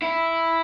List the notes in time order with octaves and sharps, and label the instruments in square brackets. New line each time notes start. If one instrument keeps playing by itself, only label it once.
[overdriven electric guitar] E4